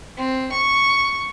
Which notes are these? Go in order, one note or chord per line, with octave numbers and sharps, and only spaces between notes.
C4
C#6